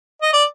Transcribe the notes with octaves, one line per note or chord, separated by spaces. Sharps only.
D#5
D5